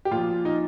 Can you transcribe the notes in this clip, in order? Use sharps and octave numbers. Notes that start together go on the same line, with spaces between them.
G4
A#2 F3 F4
D#4